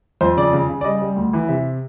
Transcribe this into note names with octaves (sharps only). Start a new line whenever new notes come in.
F2 C5
C#3 D5
C#3
C#3
D5
G3 D#5
G3
D2
E3
C3 E5